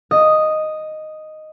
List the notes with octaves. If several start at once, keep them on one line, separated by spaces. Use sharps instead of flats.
D#5